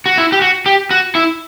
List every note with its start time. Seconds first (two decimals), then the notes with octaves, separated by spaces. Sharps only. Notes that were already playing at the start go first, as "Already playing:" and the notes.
0.06 F#4
0.17 E4
0.32 G4
0.42 F#4
0.66 G4
0.91 F#4
1.15 E4